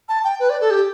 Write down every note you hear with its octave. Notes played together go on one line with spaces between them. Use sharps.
A5
G5
B4
D5
A4
G4